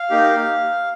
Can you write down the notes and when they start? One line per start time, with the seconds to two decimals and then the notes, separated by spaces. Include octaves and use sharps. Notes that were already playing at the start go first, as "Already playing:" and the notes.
Already playing: F5
0.10 A#3 D#4 G4